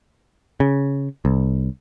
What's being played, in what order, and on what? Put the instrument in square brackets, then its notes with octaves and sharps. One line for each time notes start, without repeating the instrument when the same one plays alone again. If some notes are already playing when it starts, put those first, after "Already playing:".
[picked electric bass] C#3
C2